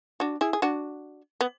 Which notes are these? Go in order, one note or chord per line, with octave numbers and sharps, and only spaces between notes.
D4 F#4
E4 G#4
G#4
D4 F#4
B3